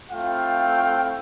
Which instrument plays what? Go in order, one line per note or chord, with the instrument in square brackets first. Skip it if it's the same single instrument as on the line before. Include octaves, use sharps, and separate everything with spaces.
[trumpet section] A3 C4 E4 F4 F5 G5